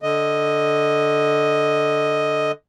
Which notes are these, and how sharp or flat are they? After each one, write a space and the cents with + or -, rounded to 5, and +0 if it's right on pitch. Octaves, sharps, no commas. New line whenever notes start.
D3 +0 D#5 +0